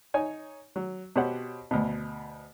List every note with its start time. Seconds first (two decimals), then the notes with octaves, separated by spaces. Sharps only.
0.14 D#4 C#5 G#5
0.76 F#3
1.16 B2 F#4 G4 C5 C#5 F#5
1.71 D2 B2